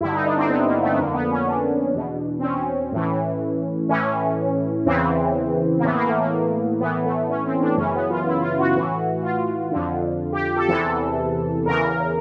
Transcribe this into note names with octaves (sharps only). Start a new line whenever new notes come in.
G2 D3 E4
D#4
D4
C4
B3
A#3
A3
B3
F2 D3 A#3
B3
C#4
D4
E2 B2
C4
C#4
A2 E3
A2 E3 C#4
E2 C#3 E3 C4
A#3
A2 E3 B3
A#3
A3
A#3
A2 E3 B3
A3
C#4
C4
D4
F#2 C#3 E3 C#4
B3
F4
E4
F4
F#4
A2 E3
F4
F2 D3
G4
A4
E2 C3 E3 A4
E2 C#3 E3 A#4